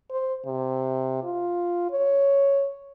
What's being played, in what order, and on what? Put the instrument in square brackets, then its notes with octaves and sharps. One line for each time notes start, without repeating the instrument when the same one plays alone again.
[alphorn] C5
C3
F4
C#5